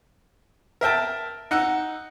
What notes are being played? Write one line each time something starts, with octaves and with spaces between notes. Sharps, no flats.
A#4 E5 G5 A5
D#4 F#5 E6